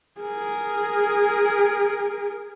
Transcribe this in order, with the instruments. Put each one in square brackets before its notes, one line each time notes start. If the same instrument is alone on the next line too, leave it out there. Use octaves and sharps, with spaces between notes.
[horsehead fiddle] G#4 A#4